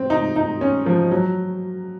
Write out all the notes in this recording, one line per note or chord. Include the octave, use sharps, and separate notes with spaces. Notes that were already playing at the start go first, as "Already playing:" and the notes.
Already playing: C4
D#4
D#4
C#4
F3
F#3